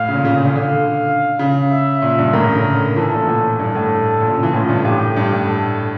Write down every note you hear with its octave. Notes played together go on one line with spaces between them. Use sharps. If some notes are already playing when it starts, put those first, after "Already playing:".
Already playing: A2 F5
C#3
A#2
C#3
C#3
D3 F5
D3
C#3
E5
A#2
G2
A2 A#4
C#3
D3
E3 A4
A#2
A2
G2 A4
A2
A#2
C#3
E3
A2 F4
G2
A2 G4
G2
A2
A4